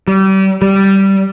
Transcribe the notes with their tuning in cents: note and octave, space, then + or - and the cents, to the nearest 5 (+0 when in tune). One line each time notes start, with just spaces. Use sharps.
G3 -30
G3 -10